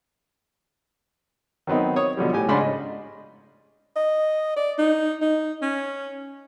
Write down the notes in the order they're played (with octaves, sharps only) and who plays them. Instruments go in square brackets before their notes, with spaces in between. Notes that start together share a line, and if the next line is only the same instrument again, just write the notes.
[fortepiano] D#3 F#3 B3 C4 D#4
C#5 D#6
B2 D3 F3 G3
A2 G4 G#5
G#2 C#3 D4 B5 C6
D#5
[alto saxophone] D#5
D5
D#4
D#4
C#4